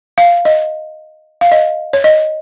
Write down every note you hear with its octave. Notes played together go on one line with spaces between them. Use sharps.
F5
D#5
F5
D#5
C#5
D#5